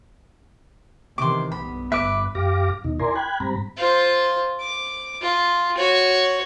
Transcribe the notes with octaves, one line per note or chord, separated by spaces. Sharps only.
C3 D#3 E3 C6 D6
B1 G2 B3 B5
G1 G2 B4 E5 D6
F#2 G4 F5 D6 A#6
D#2 B2 D#4
E4 A#4 D5 G#5 A#5 C6
G5 B5 F#6 G#6
G#2 G3 C4 A#5 B5
F4 C5
D6
F4
F#4 C#5